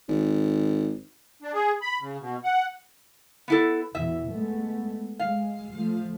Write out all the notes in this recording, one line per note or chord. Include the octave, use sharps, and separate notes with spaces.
G#1
D4
G#4
B5
C#3
B2
F#5
B3 E4 A4
E2 B2 E3 E5
G#3 A3 B3
G#3 F5
F3 A3